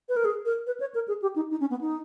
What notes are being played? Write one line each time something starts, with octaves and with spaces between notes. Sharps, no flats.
B4
A#4
G#4
A#4
B4
C#5
A#4
G#4
G4
D#4
D#4
C#4
B3
D#4